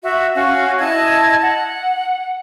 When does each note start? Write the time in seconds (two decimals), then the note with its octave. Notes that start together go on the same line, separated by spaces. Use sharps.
0.03 F#4 E5
0.35 C#4 F#4 F5
0.79 E4 D#5 A5 G#6
1.42 F#5